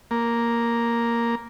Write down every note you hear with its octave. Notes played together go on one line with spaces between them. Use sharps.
A#3